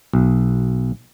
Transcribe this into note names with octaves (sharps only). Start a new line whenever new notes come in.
B1